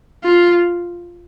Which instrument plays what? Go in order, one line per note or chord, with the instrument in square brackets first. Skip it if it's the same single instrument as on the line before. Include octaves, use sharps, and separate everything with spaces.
[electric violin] F4